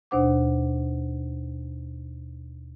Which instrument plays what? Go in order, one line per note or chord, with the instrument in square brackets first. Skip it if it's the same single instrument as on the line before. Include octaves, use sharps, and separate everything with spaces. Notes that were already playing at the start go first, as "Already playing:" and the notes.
[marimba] D#2 B2 D4 C5 F#5 D6